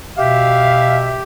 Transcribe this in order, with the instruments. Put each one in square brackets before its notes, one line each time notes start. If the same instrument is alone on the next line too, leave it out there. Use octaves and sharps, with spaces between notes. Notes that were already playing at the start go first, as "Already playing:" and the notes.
[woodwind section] B2 E5 [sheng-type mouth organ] G4 [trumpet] F5